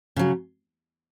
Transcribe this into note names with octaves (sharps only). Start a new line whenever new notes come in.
C#3 F#3